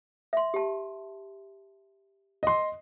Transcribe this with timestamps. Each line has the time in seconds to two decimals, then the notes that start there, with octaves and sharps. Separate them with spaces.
0.33 E5 C6
0.54 G4 A5
2.43 D#5 C6